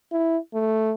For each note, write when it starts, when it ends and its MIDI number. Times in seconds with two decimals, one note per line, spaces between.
0.12 0.38 64
0.54 0.94 57